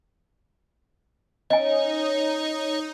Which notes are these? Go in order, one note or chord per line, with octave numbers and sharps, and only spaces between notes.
C#4 D#4 C#5 D#5 G#5